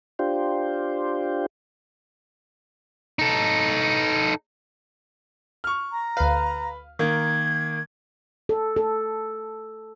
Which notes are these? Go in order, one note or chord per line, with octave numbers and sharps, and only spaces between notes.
D4 F4 G4 C5
D#4 A4
C#6 F6
A#5
D2 B4 F5
D#3 A#3 G#6
A4
A4